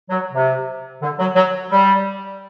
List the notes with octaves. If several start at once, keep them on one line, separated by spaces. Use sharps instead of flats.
F#3
C3
D3
F#3
F#3
G3